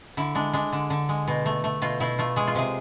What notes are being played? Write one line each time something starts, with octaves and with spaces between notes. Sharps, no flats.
D3 E4
G#3 D4
G#3 D4
D3
D3
G#3
B2
A3
A3
B2 F4
B2 E4
A3 F4
G#3 G#4
F4
C3 G#4